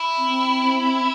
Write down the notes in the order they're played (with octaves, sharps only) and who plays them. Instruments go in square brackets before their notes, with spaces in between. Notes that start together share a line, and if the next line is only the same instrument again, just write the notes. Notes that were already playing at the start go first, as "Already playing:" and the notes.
Already playing: [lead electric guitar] E4
[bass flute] C4